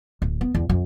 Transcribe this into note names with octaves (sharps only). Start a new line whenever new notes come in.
D1
B3
E2
F2